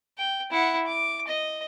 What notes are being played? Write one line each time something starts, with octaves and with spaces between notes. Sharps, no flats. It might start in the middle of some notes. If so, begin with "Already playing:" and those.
G5
E4 F#5
D6
D#5